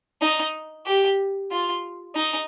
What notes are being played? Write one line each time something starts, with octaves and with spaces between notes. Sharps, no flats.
D#4
G4
F4
D#4